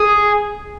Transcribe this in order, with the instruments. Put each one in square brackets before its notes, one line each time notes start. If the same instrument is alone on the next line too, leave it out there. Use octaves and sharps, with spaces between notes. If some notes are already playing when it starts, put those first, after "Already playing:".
Already playing: [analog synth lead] G#4